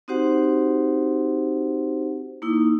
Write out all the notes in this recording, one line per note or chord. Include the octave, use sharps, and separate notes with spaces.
C4 D#4 F#4 G4 C5 F#5
A#3 D#4 E4 D#6